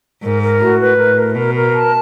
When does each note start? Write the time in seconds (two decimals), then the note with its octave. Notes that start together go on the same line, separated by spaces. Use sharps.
0.23 G#2 A#4
0.42 A#4
0.61 A2 F#4
0.80 B4
0.98 A2 A#4
1.17 A#4
1.35 B2 A#4
1.55 A#4
1.73 A5